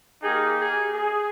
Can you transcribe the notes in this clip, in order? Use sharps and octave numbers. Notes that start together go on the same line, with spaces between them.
A#3 D#4 G4 G#4
G#4
G#4